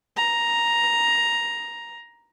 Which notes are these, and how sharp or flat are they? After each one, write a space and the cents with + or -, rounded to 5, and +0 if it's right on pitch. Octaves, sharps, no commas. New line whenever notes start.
A#5 +5